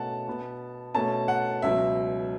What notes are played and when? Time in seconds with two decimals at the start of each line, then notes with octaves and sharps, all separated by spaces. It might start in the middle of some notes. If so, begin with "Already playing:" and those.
Already playing: B2 A3 C#4 F#5 A5
0.27 B2 B3
0.95 B2 A3 C#4 A5
1.28 F#5
1.62 C#2 B2 F#3 E5